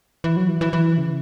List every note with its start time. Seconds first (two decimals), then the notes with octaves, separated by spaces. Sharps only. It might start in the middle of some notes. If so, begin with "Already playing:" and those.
0.24 E3
0.37 F#3
0.49 E3
0.61 E3
0.73 E3
0.98 C#3